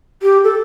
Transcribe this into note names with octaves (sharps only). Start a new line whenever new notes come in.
G4
A4